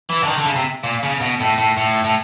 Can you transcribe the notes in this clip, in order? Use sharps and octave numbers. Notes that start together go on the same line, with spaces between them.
E3
D3
D#3
D3
C#3
C3
A#2
C#3
B2
A2
A2
A2
A2